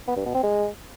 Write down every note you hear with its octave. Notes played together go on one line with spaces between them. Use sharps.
B3
G2
B2
C4
G#3